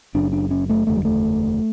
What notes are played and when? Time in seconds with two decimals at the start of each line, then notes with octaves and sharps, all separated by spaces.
0.14 F#1 F#2 C#3 D4
0.33 D4
0.51 C#4
0.69 A3
0.87 F#1 E2 D3 A3
0.96 G3
1.05 A3